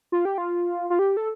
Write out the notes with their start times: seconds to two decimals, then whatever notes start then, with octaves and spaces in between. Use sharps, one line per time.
0.12 F4
0.25 G4
0.38 F4
0.90 F4
0.99 G4
1.17 A4